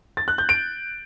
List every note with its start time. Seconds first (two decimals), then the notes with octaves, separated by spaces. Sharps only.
0.17 A6
0.28 F#6
0.38 G6
0.49 D7